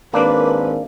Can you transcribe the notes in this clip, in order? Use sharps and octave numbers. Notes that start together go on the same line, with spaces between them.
G#1 A#3 D4 B4